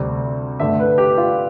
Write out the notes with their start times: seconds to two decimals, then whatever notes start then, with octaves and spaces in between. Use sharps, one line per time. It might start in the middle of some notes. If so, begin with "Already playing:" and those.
Already playing: D2 C3 G3 C4
0.60 G2 D3 A3 E5
0.80 B4
0.98 G4
1.18 F4